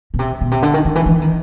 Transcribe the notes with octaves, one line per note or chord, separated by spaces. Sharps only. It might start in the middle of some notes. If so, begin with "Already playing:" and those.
B2
C3
B2
C3
D3
D#3
D#3
E3
E3
D#3